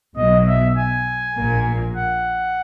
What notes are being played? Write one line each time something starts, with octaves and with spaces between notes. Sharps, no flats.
B1 B2 F#3 D#5
E5
G#5
A#1 A#2 A#3
F#5